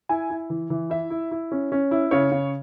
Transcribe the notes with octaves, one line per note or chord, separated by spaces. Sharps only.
E4 G#5
E4
E3
E3
E4 E5
E4
E4
C#4
C#4
E4
C#3 C#5
C#3